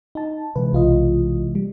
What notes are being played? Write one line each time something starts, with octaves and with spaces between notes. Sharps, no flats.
D#4 A5
C3 E3 G#3 B4
B1 F4 D#5
G3